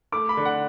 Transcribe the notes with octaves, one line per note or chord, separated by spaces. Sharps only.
A3 D6
B5
D3
F#5